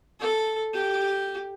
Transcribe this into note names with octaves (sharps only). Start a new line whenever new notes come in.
A4
G4